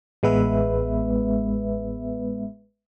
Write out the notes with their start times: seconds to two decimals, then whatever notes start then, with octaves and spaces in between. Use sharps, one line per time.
0.23 A1 G#3 B3 B4 E5